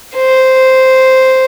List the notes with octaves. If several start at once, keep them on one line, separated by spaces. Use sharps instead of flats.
C5